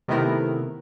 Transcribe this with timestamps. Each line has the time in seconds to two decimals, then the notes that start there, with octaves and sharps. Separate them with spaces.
0.08 C3 D#3 A3 B3 E4 A#4